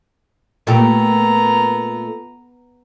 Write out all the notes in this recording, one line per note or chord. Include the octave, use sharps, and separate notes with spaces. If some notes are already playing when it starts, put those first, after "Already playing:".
A#2 A3 B3 G4 A#5